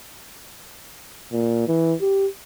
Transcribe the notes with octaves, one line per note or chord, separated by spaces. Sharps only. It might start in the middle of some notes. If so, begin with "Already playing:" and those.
A#2
E3
G4